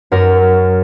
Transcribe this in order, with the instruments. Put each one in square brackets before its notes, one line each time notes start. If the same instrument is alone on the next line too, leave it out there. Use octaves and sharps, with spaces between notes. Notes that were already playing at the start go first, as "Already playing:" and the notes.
[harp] F#2 A#4